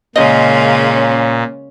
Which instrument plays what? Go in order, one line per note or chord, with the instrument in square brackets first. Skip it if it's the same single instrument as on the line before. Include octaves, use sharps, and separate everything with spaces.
[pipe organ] A#2 [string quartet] C#3 G#3 A#3 [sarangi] C#4 [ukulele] D#5